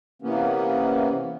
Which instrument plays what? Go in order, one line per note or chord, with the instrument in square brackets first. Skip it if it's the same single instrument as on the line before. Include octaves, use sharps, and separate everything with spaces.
[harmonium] C3 E3 A#3 B3 C#4